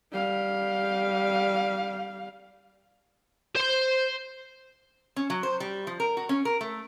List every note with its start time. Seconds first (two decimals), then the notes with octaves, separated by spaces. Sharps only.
0.12 G3 F5
3.56 C5 C6
5.16 C#4
5.30 F#3
5.43 C5
5.60 G3
5.87 F3
6.00 A#4
6.17 F#4
6.29 C#4
6.45 A#4
6.61 A3